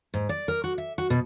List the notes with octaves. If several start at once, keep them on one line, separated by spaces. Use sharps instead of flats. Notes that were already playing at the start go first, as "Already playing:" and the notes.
G#2
D5
A#4
F#4
E5
F#4
B2